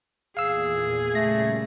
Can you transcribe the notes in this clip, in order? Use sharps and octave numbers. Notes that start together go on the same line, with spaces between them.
E2 A#2 G#4 F5 E6
A#2 C#3 G3 A3 A#6